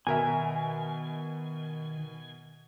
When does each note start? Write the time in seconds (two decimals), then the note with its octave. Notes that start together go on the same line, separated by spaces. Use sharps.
0.07 B2 D#3 A#4 E5 G#5